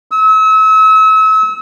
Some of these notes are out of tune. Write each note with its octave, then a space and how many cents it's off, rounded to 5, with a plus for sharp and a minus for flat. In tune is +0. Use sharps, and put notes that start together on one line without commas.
E6 -35